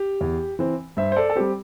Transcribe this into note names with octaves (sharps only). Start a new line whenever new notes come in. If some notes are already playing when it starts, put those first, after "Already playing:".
Already playing: G4
E2
E3 C4
G2 C5 E5
C5
A4 D5
A4
G3 C4 G4